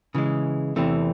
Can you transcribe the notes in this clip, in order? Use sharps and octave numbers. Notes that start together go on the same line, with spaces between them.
C#3 E3 G#3
E2 C3 E3 A3 C4